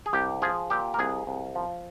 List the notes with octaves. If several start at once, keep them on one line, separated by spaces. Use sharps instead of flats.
G#4
C2 G4
F3 G#4
A#2 G4
A#4
C2 G#4
C2
F3